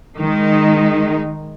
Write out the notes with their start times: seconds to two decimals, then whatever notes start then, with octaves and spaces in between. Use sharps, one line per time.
0.18 D#3 G#3 D#4